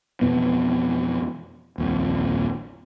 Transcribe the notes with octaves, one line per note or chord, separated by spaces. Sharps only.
F2 B2 E3 B3
D#1 A#1 F2